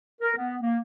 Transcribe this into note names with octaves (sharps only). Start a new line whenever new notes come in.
A#4
B3
A#3